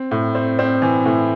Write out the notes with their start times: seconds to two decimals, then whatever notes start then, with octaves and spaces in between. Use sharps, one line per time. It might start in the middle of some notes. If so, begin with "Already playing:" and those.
Already playing: C4
0.11 A2
0.35 C4
0.59 C4
0.82 E3
1.05 A2